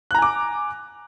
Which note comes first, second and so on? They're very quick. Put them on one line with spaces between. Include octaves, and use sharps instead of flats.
F#6 A#5 G#5 D6